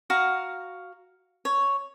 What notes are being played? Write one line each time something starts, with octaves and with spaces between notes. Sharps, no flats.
F#4 F5 A#5
C#5